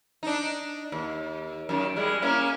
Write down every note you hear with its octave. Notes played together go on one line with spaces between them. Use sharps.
D4 D#4
D#2
F#2 D#3
G3 G#3 E4
A#3 C#4 E4